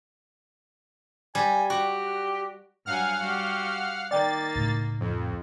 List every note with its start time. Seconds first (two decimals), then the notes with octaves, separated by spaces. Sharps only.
1.35 G3 G#5
1.70 F#4 G4
2.86 G2 F#3 F5 F#5 G#5 F6
3.19 G3 F#4 G4
4.11 D#3 A#3 D5 G5 A6
4.56 C#2 A2
5.00 F2